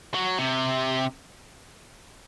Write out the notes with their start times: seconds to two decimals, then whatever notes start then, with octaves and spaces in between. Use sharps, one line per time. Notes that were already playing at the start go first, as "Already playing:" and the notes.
0.14 F#3
0.38 C3